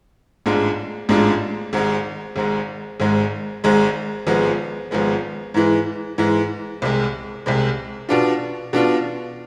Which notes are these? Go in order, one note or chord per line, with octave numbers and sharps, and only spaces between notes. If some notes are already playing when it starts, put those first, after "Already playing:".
A1 G#2 G#3 D4 F4
A1 G#2 G#3 D4 F4
G#1 G#2 G#3
G#1 G#2 G#3
G#1 G#2 G#3
G#1 G#2 G#3
G#1 G#2 F3 G#3 B3
G#1 G#2 F3 G#3 B3
G#2 E3 G#3
G#2 E3 G#3
C2 C3 G#3
C2 C3 G#3
B2 B3 D4 F4
B2 B3 D4 F4